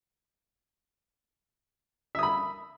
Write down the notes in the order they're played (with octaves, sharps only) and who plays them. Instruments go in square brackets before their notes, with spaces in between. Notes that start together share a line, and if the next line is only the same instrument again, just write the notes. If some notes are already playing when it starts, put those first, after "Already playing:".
[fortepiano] E5
D#6
B5